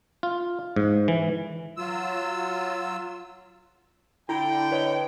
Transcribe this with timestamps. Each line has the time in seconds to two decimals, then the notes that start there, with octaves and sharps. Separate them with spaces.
0.23 F4
0.76 G#2
1.08 E3
1.77 F#3 F4 E6
4.29 D3 E4 G5 A#5
4.71 B4 C#5 D#5